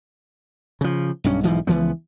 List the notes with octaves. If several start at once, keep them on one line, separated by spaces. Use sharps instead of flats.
C#3 F3
B1 G2 C#4
B1 G#2 E3 F3
C#2 E3 F3 B3